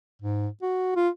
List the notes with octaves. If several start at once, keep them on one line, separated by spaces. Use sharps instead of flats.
G#2
F#4
F4